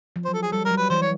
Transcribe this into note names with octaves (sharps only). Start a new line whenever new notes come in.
F3
C5
F#3
A4
G#4
G3 A4
F#3 A#4
G3
B4
E3 C5
C#5